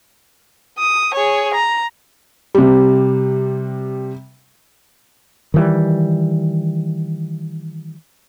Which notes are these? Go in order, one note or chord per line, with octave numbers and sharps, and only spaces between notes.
D#6
G#4 C#5
A#5
C3 G3
D#3 E3 G3